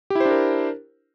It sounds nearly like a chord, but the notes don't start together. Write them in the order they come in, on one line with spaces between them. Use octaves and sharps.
G4 E4 C5 D4 A#4